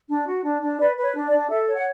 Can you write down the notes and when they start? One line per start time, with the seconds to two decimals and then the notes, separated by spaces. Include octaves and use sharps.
0.09 D4
0.26 F#4
0.44 D4
0.62 D4
0.79 B4 D5
0.97 B4
1.03 C#5
1.15 D4
1.26 D5
1.32 D4
1.49 A4 E5
1.68 C#5
1.75 F#5